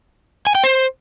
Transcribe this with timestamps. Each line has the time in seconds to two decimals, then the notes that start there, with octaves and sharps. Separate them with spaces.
0.47 G#5
0.55 G5
0.64 C5